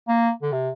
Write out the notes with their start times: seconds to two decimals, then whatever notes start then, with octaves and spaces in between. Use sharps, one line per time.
0.08 A#3
0.42 D3
0.52 C3